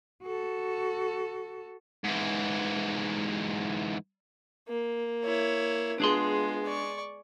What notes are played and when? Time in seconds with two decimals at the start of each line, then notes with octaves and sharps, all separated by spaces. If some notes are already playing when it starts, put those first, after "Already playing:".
0.22 F#4 A4
2.04 G#2 E3
4.68 A#3
5.25 E4 C#5
6.00 G#3 B3 D4 F4 G#4 C6
6.65 D5 C#6